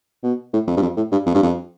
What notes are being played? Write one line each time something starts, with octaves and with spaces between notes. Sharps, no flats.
B2
A2
F2
G2
F2
A2
G2
F2
G2
F2